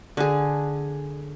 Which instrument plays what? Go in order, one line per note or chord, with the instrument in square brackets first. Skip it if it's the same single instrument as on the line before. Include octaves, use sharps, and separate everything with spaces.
[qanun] D3 G#4